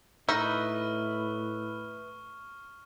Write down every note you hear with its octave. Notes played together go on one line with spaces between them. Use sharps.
A2 D#4 B4 D#5 E5 C#6 F6